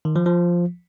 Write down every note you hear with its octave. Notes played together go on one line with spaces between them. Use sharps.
D#3
F3
F3